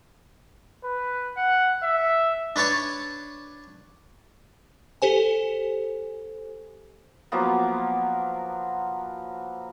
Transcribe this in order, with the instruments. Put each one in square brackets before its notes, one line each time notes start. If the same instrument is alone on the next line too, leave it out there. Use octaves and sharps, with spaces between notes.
[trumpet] B4
F#5
E5
[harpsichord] D4 B4 C#5 A5 C#6
[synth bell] G4 A4 C5 G#5
[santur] F3 F#3 A#3 B3